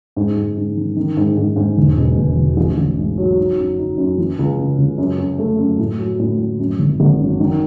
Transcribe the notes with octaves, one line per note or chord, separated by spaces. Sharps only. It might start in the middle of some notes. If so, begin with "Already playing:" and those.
G#2
G#2
G#2
D#3
D#3
G#2
G#2
G#2
E1
B2
E1
E1
A1
A1
G#2
F#3
D#4
F#2
D#4
F#2
E3
C#2
C#3
C#2
F#2
F#2
A3
F#2
A2
F#3
A2
A2
F#2
G#1
G#1
F#2
D#3